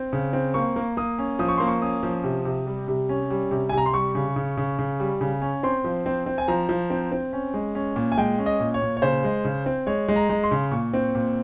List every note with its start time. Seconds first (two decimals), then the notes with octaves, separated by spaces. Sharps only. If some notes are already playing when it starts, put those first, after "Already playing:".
Already playing: C4
0.13 C#3
0.33 C4
0.54 A#3 C#6
0.76 A#3
0.97 A#3 D#6
1.18 C#4
1.39 F3 D#6
1.49 C#6
1.58 A#3 C6
1.67 C#6
1.81 C#4 D#6
2.03 F3
2.24 C3
2.45 C3
2.66 G3
2.88 C3
3.09 C#4
3.30 G3
3.51 C3
3.69 C3 G#5
3.78 A#5
3.86 C6
3.94 G3 C#6
4.15 C#3
4.36 C#3
4.57 C#3
4.79 C#3
5.00 G3
5.21 C#3
5.42 C#4
5.63 C4 C6
5.84 F3
6.06 C4
6.26 C4
6.38 G#5
6.48 F3 A#5
6.69 F3
6.90 C4
7.12 C4
7.33 C#4
7.54 G#3
7.75 C#4
7.96 A#2
8.12 G#5
8.18 G#3 G5
8.38 C#4
8.46 D#5
8.60 A#2
8.74 C#5
8.82 A#2
8.97 C#5
9.02 C#3 C5
9.24 G#3
9.45 C#3
9.66 C4
9.87 G#3 C#5
10.08 G#3
10.16 A#5
10.29 G#3
10.44 C6
10.51 C#3
10.71 A#2 C#6
10.94 C4
11.15 A#2